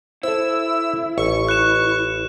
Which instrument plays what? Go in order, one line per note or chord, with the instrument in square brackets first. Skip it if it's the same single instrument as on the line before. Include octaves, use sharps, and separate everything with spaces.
[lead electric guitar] E4 [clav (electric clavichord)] A4 C5 [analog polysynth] E6
[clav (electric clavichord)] A1 [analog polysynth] C#6
[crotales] F#6 E7